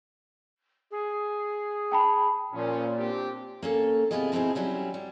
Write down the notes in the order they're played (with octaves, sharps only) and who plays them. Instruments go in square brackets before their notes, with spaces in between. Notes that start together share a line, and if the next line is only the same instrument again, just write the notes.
[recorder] G#4
[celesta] G5 A5 B5
[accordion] A#2 [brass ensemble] F3 C#4
[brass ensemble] C4 D4 G4
[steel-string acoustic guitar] A#3 C#4 A4
C3 B3 E4 F4 G#4 D#5
B2 F3 C4 D#4 E4 G#4
F#3 G3 C#4 E4
G3